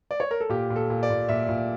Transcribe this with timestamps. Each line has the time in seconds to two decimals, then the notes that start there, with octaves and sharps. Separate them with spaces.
0.11 D5
0.20 C#5
0.31 A#4
0.40 A4
0.49 A#2 G4
0.70 A#2
0.76 A4
0.90 A#2
1.03 D5
1.10 A#2
1.29 A#2 E5
1.49 A#2